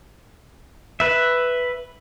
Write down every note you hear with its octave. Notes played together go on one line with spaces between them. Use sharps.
B4 E5